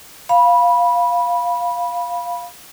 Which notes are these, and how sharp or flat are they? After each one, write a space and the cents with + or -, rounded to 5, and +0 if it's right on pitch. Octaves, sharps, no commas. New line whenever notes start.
F5 +0 B5 -15